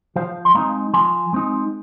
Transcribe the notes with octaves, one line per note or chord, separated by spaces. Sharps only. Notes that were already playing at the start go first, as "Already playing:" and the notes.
F3 C5 F5
C6
G#3 C4 D#4 F5 A#5
F3 G#5 C6
G#3 C4 D#4